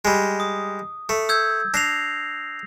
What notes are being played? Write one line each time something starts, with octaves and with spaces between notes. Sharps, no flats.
G3 G#3
D#6
A3
E6 G6 G#6
D4 A#6 C7 F7